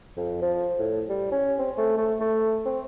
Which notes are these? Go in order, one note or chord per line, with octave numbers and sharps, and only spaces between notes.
F2
F3
A2
G3
C#4
C4
A3
A3
A3
C4